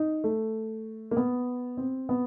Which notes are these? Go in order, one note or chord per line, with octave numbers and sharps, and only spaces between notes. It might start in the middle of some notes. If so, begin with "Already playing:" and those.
Already playing: D#4
A3
A#3
B3
C4
B3